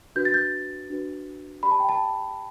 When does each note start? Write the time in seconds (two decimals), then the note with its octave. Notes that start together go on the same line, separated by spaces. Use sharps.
0.16 D4 F#4 B4 G6
0.25 A6
0.34 G6
0.90 D4 F#4 B4
1.63 G4 D5 B5
1.71 A5
1.80 G5
1.89 A5